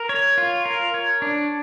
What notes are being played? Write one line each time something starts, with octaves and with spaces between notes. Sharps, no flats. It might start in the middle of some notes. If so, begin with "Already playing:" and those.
Already playing: A#4
C#5
F4
A#4
C#5
D4